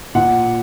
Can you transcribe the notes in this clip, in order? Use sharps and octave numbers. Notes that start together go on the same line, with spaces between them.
A#2 F#5